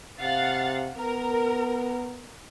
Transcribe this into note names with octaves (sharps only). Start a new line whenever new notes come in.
C3 F5 F#5 A6
B3 A#4